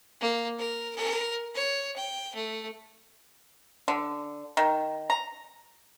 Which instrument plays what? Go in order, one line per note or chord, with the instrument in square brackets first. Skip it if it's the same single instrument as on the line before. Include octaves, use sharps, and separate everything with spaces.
[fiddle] A#3
A#4
A#4
C#5
G5
A3
[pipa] D3
D#3
A#5